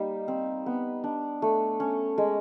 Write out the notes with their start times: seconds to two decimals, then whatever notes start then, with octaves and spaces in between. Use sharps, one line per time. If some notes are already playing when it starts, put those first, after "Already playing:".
Already playing: G3 A#3 D#4
0.28 C4
0.66 B3
1.04 D4
1.42 A3
1.80 C#4
2.18 G#3